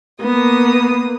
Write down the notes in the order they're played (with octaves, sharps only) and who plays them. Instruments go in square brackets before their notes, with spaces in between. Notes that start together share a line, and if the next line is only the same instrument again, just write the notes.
[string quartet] A#3 D#6 [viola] B3